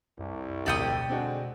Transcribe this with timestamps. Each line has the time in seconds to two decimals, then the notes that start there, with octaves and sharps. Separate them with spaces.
0.19 C2 F#2
0.66 D1 F2 B2 D5 G5 D#6 C#7
1.09 D3 G#3 C4 D4 F#4